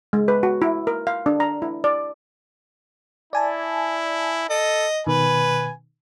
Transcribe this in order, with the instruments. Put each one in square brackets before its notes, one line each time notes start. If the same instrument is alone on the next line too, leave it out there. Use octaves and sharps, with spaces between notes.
[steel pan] G#3
B4
F#4
E4
A#4
F5
D4
A#5
E4
D5
[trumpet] E4 [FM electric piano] D5 G#5 A5
[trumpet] A4 [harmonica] D#5
[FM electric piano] B2 D#3 [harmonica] B4 [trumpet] G#5